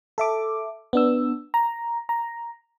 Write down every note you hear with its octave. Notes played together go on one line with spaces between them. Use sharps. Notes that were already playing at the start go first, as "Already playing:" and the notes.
A4 E5 D6
B3 D4 E6
A#5
A#5